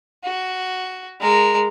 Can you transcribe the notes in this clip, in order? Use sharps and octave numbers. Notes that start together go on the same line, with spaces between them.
F#4
G#3 A#4